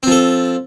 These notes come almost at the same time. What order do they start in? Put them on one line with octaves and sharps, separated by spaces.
C4 F3 A4